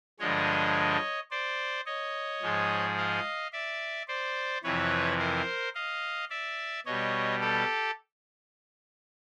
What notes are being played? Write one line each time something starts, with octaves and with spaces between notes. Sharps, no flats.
G2 D3 F3 G#3 C#5 D#5
C5 D5
C#5 D#5
G#2 F3 G#3
D#5 F5
D5 E5
C5 D5
F2 C3 E3 B4 C#5
A#4 C5
D#5 F5
D5 E5
B2 G3 C#5 D#5
G4 A4